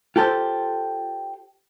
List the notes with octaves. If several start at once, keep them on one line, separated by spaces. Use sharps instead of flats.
F4 G4 A4 C5